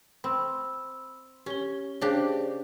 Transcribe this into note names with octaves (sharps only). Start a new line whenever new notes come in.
C4 B5 C6 E6
C#4 G4 G7
C#3 D4 G4 G#4 C5 D5